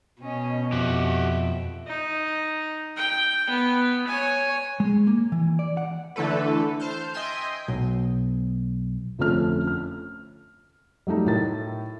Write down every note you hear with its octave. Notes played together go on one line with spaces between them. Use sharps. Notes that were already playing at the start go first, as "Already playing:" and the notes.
B2 C#4 D#5
F2 F#4 G4 E5
D#4
G5
B3
C#5 G#5
G#3
A#3
E3
D5
F#5
D3 E3 A3 A4 B4
C5 A5 F6 G6
D#5 E5 G5 G#5 C6 G6
B1
G1 F2 F3 A3 C#4 F6
F6
F#3 G3 A3 D#4
A2 A#4 A6